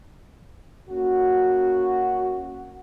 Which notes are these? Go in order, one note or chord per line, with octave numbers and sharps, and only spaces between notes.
A#3 C#4 F#4